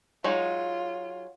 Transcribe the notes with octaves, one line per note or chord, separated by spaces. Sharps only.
F#3 G#3 D#4 F4